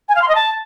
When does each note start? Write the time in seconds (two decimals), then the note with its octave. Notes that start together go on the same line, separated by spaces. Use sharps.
0.09 G#5
0.15 F5
0.22 C6
0.28 D#5
0.35 A5